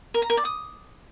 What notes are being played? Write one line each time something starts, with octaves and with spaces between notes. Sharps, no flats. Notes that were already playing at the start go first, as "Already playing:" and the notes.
A#4
A#5
A#4
D5
D#6